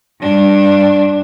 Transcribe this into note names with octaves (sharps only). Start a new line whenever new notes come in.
G2 D4